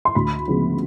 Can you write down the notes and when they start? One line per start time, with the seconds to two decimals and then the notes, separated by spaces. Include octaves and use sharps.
0.05 C6
0.15 D2 B5
0.48 C#3 F3 G#3 B3